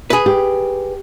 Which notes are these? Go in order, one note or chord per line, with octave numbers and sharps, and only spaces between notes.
G#4 B4
G4